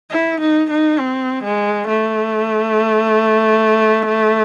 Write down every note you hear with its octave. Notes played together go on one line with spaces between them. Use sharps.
E4
D#4
D#4
C4
G#3
A3